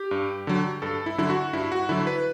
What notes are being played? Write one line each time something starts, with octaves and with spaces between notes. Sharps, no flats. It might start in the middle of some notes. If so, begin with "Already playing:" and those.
Already playing: G4
G2
D3 F#3
G2 A4
E4
D3 F#3 E4
F#4
G2 E4
F#4
D3 F#3 E4
B4